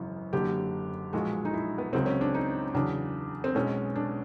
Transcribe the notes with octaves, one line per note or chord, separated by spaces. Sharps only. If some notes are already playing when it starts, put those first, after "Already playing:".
Already playing: G#1 F#2 C#3 E3
F#1 F#2 D3 G4
B1 A#2 F3 G#3 F#4
D#4
E4
B3
C#2 C#3 F#3 C4
C#4
D4
D#4
E2 C#3 F#3 D4
C4
B1 B2 G#3 C#4
D4